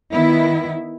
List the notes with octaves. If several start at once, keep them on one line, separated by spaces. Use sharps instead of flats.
D#3 B3 E4